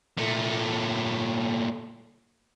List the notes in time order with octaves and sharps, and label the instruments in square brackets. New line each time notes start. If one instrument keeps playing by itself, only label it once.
[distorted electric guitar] A#2 A3